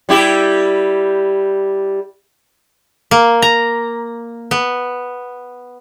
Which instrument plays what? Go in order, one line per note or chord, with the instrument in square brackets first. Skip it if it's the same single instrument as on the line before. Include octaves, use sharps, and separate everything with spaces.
[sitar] G3 E4 G4
[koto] A#3
A#5
B3